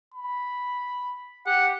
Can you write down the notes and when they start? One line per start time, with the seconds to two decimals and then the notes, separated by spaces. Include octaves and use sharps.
0.14 B5
1.46 G4 F#5